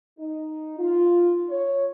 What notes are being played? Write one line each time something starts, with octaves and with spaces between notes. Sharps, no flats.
D#4
F4
C#5